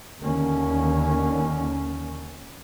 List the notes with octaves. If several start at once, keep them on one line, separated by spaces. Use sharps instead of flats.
D#2 D3 A#3 C#4